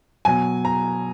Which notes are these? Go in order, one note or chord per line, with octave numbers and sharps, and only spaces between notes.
B2 F#3 G#5
A#5